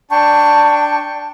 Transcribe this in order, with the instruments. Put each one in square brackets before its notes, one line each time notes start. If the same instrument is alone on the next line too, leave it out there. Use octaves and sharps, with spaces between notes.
[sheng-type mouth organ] D4 G5 C#6 [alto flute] A5